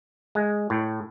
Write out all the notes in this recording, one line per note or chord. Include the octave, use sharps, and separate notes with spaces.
G#3
A2